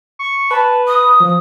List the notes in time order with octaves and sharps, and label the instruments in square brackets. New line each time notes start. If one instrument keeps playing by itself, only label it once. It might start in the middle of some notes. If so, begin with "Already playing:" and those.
[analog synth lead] C#6
[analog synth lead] B4 [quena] A5
[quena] D#6
[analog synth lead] F3